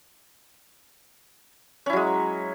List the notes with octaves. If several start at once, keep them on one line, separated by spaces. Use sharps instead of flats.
F#3 G#3 C#4 E4